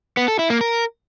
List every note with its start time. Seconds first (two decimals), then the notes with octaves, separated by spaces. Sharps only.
0.17 B3
0.28 A4
0.39 E4
0.50 A#3
0.61 A#4